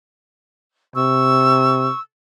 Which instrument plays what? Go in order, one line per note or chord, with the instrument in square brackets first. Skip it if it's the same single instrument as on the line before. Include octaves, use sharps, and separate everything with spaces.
[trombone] C3 [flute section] C#6 E6